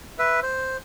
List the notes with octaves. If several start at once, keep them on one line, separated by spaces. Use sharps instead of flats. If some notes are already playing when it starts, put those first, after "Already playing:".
B4 E5
C5